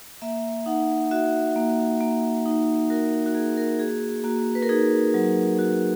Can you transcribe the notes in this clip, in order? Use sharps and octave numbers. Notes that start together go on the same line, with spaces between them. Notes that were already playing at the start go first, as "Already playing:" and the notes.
A#3 E5
D#4 F#5
F#4 E5
A#3
A#3
D#4
F#4 A#4
F#4
A#3 G#4
A#4
F#4 G#4
A#3 F#4
B4
A#4
D#4 G#4
F#3
F#4